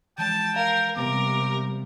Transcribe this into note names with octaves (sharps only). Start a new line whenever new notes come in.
E3 F3 G#3 G5 A5
A#4 F5
C3 G3 B3 A#4 D6